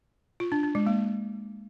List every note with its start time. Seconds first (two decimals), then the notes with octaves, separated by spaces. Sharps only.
0.40 F4
0.52 D4
0.63 D4
0.75 G#3
0.87 A#3